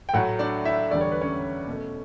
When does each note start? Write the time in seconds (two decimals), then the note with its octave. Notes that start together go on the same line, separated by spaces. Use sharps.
0.09 G5
0.14 A2 F#3 A3 F#4 F#5
0.39 D4 D5
0.65 E4 E5
0.91 E2 D3 G3 D5
1.01 C#5
1.12 B4
1.21 C#4 C#5
1.68 B2 A3